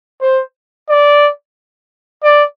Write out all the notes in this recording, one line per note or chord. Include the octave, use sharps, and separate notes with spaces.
C5
D5
D5